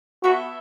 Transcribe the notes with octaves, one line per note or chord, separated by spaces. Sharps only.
B3 E4 F#4 A4 E5